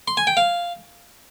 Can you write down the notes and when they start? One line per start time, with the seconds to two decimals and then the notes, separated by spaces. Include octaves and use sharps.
0.08 C6
0.17 G#5
0.27 G5
0.37 F5